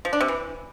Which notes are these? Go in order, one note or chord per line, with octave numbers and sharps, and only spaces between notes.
F3
D4
C3
E3